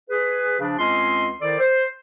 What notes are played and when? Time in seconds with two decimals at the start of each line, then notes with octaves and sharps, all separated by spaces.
0.10 G#4 B4
0.60 C#3 F3 D4
0.79 C#2 C4 C#4 D#5 C6
1.41 D#3 E4 A4 C5 D5
1.59 C5